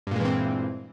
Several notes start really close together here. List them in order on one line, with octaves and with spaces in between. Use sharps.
G2 A#2 G#3 E3 C4